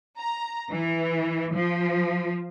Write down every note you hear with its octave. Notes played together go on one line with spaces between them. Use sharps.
A#5
E3
F3